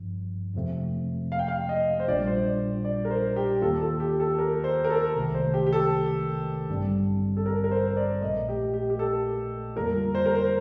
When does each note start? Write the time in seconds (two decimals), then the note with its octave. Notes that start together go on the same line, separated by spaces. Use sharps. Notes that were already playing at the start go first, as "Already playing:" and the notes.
Already playing: G1 G2 F3
0.54 F2 C3 F3 A3 C4
1.32 F5
1.39 G5
1.48 F5
1.69 D#5
2.00 C5
2.08 A#1 A#2 G3 D4 F4 D5
2.27 C5
2.46 D5
2.85 D5
3.05 A#4
3.11 C5
3.36 G4
3.62 D#2 D#3 A#3 F4 A4
3.81 A4
4.00 G4
4.20 A4
4.39 A#4
4.64 C5
4.85 A#4
4.90 A4
5.15 C2 C3 D#3 A3
5.34 C5
5.54 G4
5.67 G4
5.73 A4
6.69 A1 G2 D3 G3 C4
7.37 A4
7.46 A#4
7.64 A#4
7.71 C5
7.88 C5
7.97 D5
8.22 A#1 A#2 A3 D#5
8.49 G4
8.74 G4
8.90 G4
8.99 A4
9.76 F2 D3 G3 A#3 F4 A#4
10.15 C5
10.26 A#4
10.35 C5